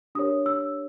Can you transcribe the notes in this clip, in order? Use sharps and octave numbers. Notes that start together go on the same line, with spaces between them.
D4 G4 A#4 C#5 D#6
E6